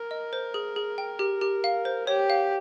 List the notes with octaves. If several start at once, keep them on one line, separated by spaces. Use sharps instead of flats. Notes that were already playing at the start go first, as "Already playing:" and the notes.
Already playing: A#4
D#5
C5
G#4
G#4
G5
G4
G4
F5
C5
G4 C#5
F5